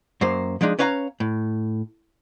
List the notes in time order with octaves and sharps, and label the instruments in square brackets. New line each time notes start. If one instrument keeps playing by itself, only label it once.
[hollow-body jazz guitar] F#2 F#3 A#3 C5
F3 G#3 D4 D#4
C#4 B4 C#5 F5 G#5 A#5
A2